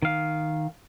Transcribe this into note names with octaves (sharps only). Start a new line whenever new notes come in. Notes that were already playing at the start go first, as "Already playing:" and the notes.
D#3 F5